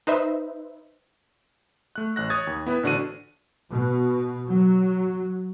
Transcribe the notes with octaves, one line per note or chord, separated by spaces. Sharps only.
D#4 B4 C5 D#5 E5
A3 F#6
A1 F#6 A#6
C#5 D#6 G#6 A6
D#2
B3 E4 B4
A1 D3 D4 F#4 C5 D#7
B2
F#3